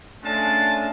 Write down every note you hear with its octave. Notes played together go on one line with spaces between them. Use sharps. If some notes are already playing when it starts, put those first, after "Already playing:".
G#3 A3 C#4 D4 F4 A5